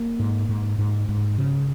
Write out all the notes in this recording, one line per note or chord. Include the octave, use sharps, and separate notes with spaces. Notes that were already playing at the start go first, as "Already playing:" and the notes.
Already playing: A#3
G#2
G#2
G#2
G#2
C#3